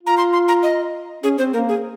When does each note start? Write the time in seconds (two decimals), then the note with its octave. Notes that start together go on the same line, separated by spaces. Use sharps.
0.03 F4 A#5
0.17 C6
0.33 C6
0.48 A#5
0.63 D#5
1.23 C#4 G#4
1.38 C4 C5
1.53 A#3 A#4
1.69 G#4